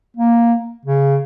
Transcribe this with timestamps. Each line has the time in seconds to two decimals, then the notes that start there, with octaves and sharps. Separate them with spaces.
0.17 A#3
0.85 C#3